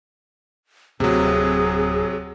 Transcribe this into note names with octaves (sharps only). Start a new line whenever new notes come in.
D1 C3 F#3 G#4